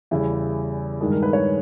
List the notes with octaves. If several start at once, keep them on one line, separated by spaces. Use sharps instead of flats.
E2 C#3 E3 G3 E4
G2 D#3 G#3
A#4
B4
C#5